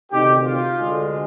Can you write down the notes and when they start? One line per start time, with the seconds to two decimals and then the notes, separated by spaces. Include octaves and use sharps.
0.11 D2 C3 D#3 D#4 G4
0.44 F4
0.77 D2 D3 G#3